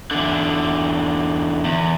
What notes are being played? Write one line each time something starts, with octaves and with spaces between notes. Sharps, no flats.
E2 D3
E2